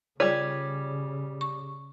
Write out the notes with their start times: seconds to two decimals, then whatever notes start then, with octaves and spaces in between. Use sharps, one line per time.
0.20 C#3 G3 F4 G#4 C#5 D5
1.41 C#6